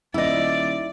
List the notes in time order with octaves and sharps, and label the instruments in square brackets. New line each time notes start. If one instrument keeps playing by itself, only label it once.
[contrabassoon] D#1 [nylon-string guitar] E4 D#5 [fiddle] D5